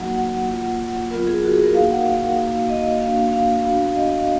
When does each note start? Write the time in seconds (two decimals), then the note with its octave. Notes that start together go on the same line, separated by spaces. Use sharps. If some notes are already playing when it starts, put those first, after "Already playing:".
Already playing: F#3 A#3 D#4 F#4 F#5
0.16 F#5
0.49 A#3 F4
1.11 F#3 B3 F4 A#4
1.27 G#4
1.43 F#4
1.54 G#4
1.63 A#4
1.74 A#3 D#4 F#4 F5
1.90 F#5
2.06 F5
2.38 A#3 D#4 F#4
2.69 D#5
3.01 A#3 D4 F#4 F5
3.16 F5
3.33 F5
3.64 B3 D4 F#4
3.96 D#5
4.12 F5